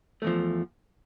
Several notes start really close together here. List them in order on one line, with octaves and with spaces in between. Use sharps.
A3 E2 F3